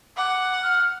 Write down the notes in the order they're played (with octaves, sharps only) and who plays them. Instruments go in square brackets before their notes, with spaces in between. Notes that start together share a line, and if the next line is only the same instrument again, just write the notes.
[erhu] F#5 [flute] D6
[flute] F6